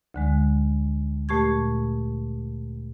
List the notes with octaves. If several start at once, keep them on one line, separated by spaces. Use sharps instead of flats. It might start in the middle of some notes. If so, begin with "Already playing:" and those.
D2 D3 G#3
A#2 A3 G4 C#6 G#6